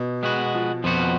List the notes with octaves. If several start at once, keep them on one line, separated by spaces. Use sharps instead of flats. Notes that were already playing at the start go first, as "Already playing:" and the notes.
Already playing: B2
G#3 B3 F#4
F3
F2 F3 B3 F#4